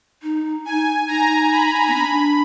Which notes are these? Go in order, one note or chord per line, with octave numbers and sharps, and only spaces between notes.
D#4
D#4 G#5
D#4 A#5
B5
B3
D4 B5